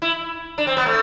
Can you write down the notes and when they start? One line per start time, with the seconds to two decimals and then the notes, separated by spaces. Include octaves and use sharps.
0.02 E4
0.58 D4
0.67 C4
0.77 B3
0.86 A3